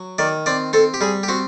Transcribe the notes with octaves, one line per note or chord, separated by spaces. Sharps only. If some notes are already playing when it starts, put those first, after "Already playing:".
Already playing: F#3
D#3 D5
C4 D5
C4 A4
G4
G3 G#4
G4
C4 F#4